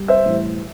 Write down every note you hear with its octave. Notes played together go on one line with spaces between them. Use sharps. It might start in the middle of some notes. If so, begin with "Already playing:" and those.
Already playing: G3
C5 E5
A2 E3 G3